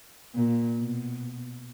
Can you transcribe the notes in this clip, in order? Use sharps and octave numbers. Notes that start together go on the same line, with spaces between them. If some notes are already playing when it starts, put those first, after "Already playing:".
A#2
B2